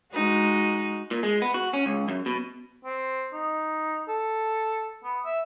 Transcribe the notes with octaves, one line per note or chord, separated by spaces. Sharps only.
G#3 D#4 F#4
A#2
G#3
B3
F#4
C#4
C#2
F#2
B2
C4
D#4
A4
B3
E5